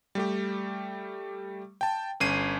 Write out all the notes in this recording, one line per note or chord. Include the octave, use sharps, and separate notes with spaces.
G3 A3 G4
G5 A5
G1 C#4 C7 D#7